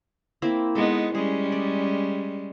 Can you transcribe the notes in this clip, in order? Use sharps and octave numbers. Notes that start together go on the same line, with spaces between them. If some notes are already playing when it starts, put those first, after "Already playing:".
A#3 C4 E4
G#3 B3 D#4 A4
G3 G#3 C#4 G#4
D5